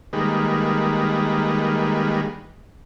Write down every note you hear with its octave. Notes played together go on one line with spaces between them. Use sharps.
D#3 G3 G#3 A#3 B4